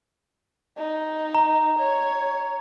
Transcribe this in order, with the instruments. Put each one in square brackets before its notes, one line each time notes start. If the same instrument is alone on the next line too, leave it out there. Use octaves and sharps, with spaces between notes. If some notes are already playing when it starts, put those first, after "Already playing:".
[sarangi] D#4
[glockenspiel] A#5
[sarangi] C#5